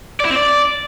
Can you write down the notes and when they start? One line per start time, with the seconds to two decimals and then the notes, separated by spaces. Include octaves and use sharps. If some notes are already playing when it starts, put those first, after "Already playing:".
0.20 D5
0.25 E4
0.30 C4
0.35 D5